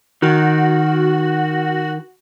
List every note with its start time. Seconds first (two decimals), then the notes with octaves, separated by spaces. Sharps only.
0.22 D#3 F#4